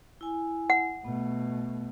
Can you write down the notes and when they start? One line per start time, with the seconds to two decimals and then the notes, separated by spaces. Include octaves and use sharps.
0.21 E4 G#5
0.70 F#5
1.05 B2 A3 B3